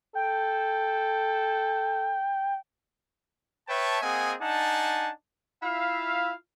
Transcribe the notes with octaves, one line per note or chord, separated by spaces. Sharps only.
A4 G5
B4 C#5 E5 G5 A5
A#3 C4 G#4 D#5 F#5 G#5
D4 D#4 F#5 G#5 A5
E4 F4 E5 F5